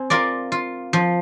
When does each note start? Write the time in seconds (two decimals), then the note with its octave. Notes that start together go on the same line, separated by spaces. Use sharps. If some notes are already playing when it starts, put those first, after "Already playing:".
Already playing: C4 G#5
0.10 F4 A#4 D5
0.52 F4
0.93 F3